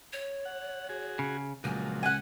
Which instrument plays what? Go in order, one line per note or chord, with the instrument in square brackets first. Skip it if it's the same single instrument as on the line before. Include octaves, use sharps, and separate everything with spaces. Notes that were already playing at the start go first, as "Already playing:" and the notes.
[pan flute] C#5
[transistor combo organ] F#5
F#4 G#4
[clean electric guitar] C#3
[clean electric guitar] C#2 [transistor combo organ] A#2 F3 F#3 [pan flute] G#5
[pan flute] C#4 [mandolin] F#5 G#5